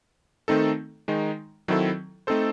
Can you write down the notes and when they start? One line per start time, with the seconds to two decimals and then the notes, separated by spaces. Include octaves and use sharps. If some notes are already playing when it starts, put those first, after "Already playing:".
0.48 D#3 A3 C4 D#4 A4
1.08 D#3 G#3 D#4
1.68 D#3 F#3 C4 E4 A4
2.27 A3 C4 D#4 A4 C5